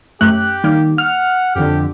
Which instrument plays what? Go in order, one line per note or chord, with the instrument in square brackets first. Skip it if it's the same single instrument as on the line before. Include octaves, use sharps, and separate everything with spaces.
[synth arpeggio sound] F#2 A3 [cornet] G4 [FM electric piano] F#6
[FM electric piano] D#3 [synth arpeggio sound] G3 A#3
[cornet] F#5 [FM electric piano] F6
[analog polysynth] F2 D3 [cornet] G4